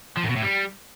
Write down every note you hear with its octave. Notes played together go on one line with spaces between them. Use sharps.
F3
A2
B2
A2
G3